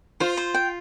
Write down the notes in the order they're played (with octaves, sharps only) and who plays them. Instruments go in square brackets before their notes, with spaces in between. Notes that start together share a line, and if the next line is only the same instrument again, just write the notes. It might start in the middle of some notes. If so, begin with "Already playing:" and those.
[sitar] F4 [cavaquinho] C5
[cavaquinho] C5
G5